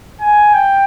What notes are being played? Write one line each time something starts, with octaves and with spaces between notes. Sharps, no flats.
G#5
G5